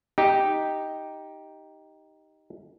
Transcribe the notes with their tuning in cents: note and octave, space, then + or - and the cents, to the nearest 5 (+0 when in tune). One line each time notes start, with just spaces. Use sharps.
D#4 +5 G4 +0